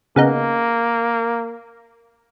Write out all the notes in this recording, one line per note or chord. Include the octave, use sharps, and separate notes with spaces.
C#3 A#3 B3 D#4